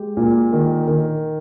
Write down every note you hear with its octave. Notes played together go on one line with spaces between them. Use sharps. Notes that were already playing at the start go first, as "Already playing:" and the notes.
Already playing: G#3 G4
A#2
D#3
D#3